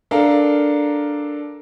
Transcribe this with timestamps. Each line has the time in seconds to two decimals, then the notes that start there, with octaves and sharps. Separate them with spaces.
0.11 D4 A4 A#4 F5